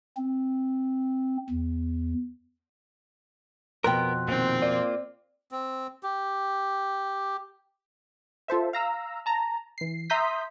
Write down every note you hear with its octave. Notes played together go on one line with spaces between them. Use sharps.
C4
E2
F2 B2 B3 A#4 G5 C6 F#6
A#2 D#3 C4
A#3 F4 D5
C4
G4
F4 A4 C5 E5
F5 A#5 E6
A5 A#5
E3 C7
E5 A#5 C6 D#6 G6 B6